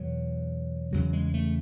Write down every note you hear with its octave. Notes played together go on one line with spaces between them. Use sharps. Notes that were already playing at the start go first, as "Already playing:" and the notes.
Already playing: E2 B2 F#3
E2 C#3 F#3
G#3
A3